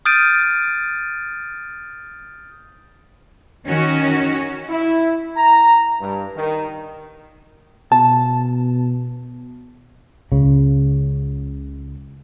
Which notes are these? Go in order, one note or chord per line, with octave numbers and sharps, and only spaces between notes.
D#6 F6 G6 A6 D7 D#7
D#3 C#4 F#4
E4
A#5
G2
D#3
B2 A5
C#2 C#3